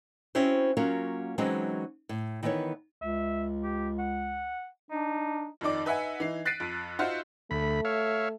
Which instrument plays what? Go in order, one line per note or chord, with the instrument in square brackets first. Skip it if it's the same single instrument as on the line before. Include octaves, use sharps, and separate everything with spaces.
[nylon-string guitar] C4 C#4 E4 F#4 C5
F#3 A#3 C#4 F4 F#4 A#4
E3 F#3 G#3 C4 C#4 D#4
A2
D#3 E3 B3 B4 C#5
[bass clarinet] C#2 [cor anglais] E5
[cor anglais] G4
F#5
[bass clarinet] D4 [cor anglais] D#4
[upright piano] F2 D#3 D#4 D5 D6
D#4 B4 E5 F#5 G#5
E3 D#4 C7
F#6 A6 B6 C7 D7 D#7
F2
D#4 F4 F#4 C5 E5 F#5
[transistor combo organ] D2 B5 [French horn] A3
[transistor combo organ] C#5 E5 F5